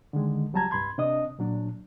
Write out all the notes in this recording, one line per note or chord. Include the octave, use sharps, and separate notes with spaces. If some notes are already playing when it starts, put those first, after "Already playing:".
D3 D#3 G#3
C#2 F#3 G3 A5 A#5 G#6
C2 G2 B5 C6 G#6
C3 D4 D#5 D#6
A#2 F#3 D4